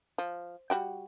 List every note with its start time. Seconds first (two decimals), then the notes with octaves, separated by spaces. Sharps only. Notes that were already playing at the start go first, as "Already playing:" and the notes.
0.18 F3
0.70 G3 F#4 G5